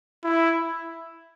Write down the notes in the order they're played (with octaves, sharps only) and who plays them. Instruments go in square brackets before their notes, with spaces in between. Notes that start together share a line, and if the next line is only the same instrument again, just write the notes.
[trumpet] E4